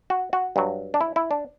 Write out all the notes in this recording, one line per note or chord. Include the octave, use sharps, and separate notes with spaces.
F#4
F#4
G2 F#3
D4
E4
E4
D4